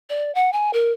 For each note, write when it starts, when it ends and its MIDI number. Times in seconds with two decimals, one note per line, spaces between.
0.09 0.34 74
0.35 0.52 78
0.53 0.71 80
0.73 0.92 70